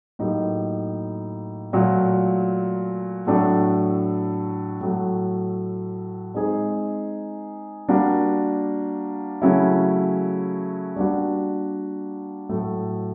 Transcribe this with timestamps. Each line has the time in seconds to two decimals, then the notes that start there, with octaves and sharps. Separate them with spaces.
0.19 A2 F#3 A#3 D#4 G4
1.73 A#2 F#3 A3
3.27 A2 F#3 A3 D4
4.81 A2 F#3 A3
6.35 G#3 C4 D#4 G#4
7.89 G3 A#3 D4 F#4
9.42 C#3 F#3 A3 C#4 E4
10.96 G3 A#3 D4 F#4
12.49 A2 F#3 A3